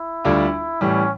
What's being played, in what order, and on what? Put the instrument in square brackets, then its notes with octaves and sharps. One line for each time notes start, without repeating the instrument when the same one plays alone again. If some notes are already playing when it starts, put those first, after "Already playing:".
Already playing: [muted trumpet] E4
[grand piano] D2 D3 G3 D4 F4
[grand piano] A2 E3 G3 [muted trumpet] C#4